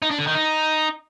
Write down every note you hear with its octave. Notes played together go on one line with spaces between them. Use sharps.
D#4
D4
D3
D#3
D#4